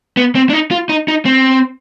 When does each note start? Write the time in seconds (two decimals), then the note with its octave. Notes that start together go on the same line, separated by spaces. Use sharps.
0.17 B3
0.35 C4
0.49 D4
0.53 D#4
0.71 F4
0.89 D#4
1.08 D#4
1.25 C4